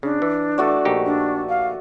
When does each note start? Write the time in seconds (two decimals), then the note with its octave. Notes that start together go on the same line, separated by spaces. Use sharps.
0.03 C#3 D4
0.22 E3
0.58 A3 F#4 D5
0.85 A#1 D#4 G4
1.06 D4
1.49 F5